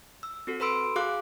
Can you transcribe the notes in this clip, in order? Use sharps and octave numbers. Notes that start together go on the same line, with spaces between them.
E6
C4 F#4 A4
A4 B4 B5 C6 E6 D7
F#4 G#4 F5 D6 F#6